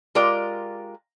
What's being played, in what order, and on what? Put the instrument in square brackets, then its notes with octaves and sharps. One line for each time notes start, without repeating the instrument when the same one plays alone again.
[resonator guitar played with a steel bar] G#3 F4 G4 A#4 D5